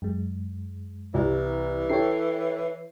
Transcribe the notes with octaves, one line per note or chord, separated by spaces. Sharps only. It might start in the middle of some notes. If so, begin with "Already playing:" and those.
F#2 G#3
C2 E3
E4 A4 C#5 G5 C7